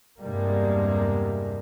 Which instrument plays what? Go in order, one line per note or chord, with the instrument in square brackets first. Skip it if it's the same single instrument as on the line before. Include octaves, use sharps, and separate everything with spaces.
[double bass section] E2 G2 C3 G3 G#3 A#3